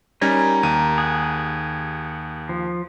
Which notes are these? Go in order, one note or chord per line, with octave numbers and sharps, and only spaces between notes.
G3 C#4 D#4 A#4 G#5
D#2 D#7
G#4 F#5
F3